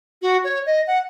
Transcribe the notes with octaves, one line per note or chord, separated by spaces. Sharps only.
F#4
C#5
D#5
F#5